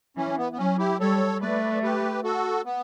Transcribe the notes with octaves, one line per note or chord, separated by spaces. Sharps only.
E3 C#4
B3
B3
F#3 C#4
E4 G4
G3 A4 C#5
A3 B4 D5
G4 B4
F#4 A4
B3